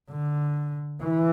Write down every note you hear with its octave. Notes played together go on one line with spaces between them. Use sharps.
D3
E3